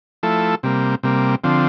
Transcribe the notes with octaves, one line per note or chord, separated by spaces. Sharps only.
F3 A3 E4 A4
C3 G3 A#3
C3 G3 A#3
D3 F3 C4